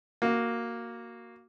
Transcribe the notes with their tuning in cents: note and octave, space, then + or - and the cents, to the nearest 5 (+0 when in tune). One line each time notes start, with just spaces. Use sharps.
A#3 +0 F#4 +0